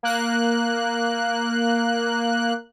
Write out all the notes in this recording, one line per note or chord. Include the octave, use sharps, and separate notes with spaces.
A#3 F#6